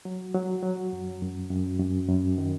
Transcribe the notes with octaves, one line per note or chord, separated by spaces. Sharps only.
F#3
F#3
F#3
F#2
F#2
F#2
F#2
F#2
D#3